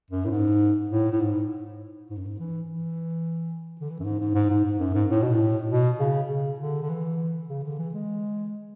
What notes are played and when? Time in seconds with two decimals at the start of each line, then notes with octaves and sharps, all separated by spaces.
0.11 F#2
0.25 A2
0.30 G#2
0.90 A2
1.12 A2
1.20 G#2
2.10 G#2
2.17 F#2
2.25 G#2
2.40 E3
2.70 E3
3.81 D3
3.90 E3
4.00 F#2
4.05 G#2
4.19 G#2
4.34 G#2
4.50 G#2
4.65 G#2
4.79 F#2
4.94 G#2
5.10 A2
5.22 B2
5.34 A2
5.70 B2
5.99 C#3
6.29 C#3
6.59 D3
6.82 D3
6.89 E3
7.49 C#3
7.64 D3
7.79 E3
7.94 G#3